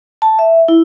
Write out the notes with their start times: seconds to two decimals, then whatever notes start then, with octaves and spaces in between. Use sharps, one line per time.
0.22 A5
0.39 E5
0.68 E4